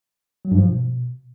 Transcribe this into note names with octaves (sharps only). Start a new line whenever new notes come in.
F#3
G2
F3
B2